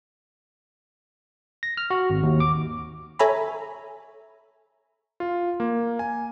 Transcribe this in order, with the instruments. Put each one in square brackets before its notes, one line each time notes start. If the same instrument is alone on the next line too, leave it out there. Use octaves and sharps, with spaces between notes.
[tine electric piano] A#6
F6
F#4
G#1
D#2
D6
[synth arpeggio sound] A4 C#5 E5 G#5 A#5 B5
[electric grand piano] F4
A#3
G#5